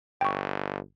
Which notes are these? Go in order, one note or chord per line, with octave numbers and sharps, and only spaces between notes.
G1 G5 C#6